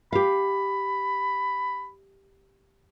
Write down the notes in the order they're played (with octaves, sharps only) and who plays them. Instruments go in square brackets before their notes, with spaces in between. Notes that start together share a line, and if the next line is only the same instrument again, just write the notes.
[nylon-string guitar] G4 F5 [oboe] B5